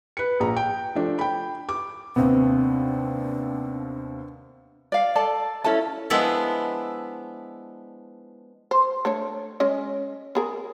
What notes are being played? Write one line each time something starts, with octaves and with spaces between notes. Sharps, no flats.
B4 C#7
A#1 A#5
G5
F3 A3 D4
G5 B5
D6
D#2 C3 B3 C4 D4
D5 F5
A4 D5 A5
C#4 E4 A4 A5
F3 G#3 B3 D4 E4 D5
C5
A3 D4 C#5
G#3 C#4 D#5
B3 G#4 A#4